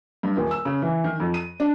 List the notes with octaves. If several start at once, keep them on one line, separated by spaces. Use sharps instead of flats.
G2
D#1
E6
C#3
E3
D#3
F2
D#7
D4